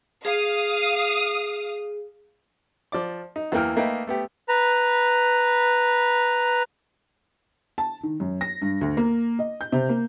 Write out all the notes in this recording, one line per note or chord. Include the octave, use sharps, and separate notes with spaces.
G#4 F5 D#6
F3 D5 D6
D#4
E2 E3 A#3 G5 F6
A3 A#3 D#4 B4 G5
A3 B3 G4
B4 A#5
A5
D#3
F#2
A#6
G2
D2
A#3
D#5
G6
C3
A#3